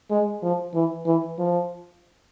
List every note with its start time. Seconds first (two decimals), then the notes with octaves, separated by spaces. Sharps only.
0.10 G#3
0.42 F3
0.74 E3
1.06 E3
1.39 F3